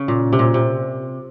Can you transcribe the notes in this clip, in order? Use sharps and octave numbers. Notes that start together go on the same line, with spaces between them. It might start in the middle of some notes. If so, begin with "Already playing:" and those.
Already playing: C#3
A#2
C3
A#2
C3